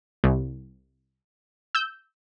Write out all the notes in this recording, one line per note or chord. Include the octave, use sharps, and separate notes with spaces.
C2
E6 G6